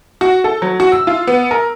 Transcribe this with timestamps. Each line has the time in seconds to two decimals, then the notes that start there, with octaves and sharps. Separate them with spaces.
0.21 F#4
0.44 A4
0.62 F#3
0.80 F#4
0.92 E6
1.07 F4
1.27 B3
1.51 A#4